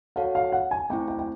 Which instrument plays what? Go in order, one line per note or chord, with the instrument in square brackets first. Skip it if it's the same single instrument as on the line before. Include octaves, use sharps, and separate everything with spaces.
[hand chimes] F#4 A4 C#5 F#5 A5 [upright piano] F5
[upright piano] F5
F#5
G#5
[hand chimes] A3 C4 E4 [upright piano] G5
[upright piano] G5
G5